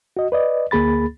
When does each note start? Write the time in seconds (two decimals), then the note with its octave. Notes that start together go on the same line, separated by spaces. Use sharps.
0.17 F#4 D#5
0.32 B4 D5 D#5
0.71 D2 A#3 G#4 B5 A6